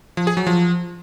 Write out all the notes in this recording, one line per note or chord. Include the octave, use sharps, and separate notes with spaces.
F3
G#4
F#3
F3